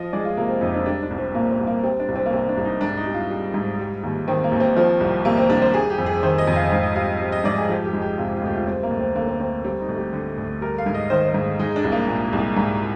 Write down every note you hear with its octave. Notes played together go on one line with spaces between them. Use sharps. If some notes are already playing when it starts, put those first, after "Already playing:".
Already playing: F3 D#5
G#3 D5
F4
C3 A#3
C4
F2 D#4
D4
G3 D4
D4
C2
C4
A#2 A#3
C4
C2
A#3
G3 C4
D4
C2
C4
A#3
C3 C4
D4
C2
D#4
G#2 D4
D#4
G3
F4
G3
G#2
G3
D#2
D#3 C4
A#3
D#2
C4
F3
C2
C3 A#3
C4
C2 D4
C5
G3 G#4
G4
F2
G#4
D#3 C5
D#5
F2
F5
G#2 F5
D#5
G3 F5
G3
D#5
G#2 D5
G#4
F3 G4
G4
G#3
G4
C3 F4
G4
F4
D2 G4
F4
G3 C4
A#3
D2
C4
D3 A#3
C4
D2 C4
G3 C4
D#4
D2
G4
D3
D2
G3 A#4
F5
G#2
D#5
D#3 C5
C5
G#2
G#3 D#4
D4
C2
A#3
A#2
C2
G#2